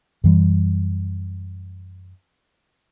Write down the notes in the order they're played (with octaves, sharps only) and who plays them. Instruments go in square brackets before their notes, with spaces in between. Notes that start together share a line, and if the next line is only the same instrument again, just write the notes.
[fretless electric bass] F#2 E3 G3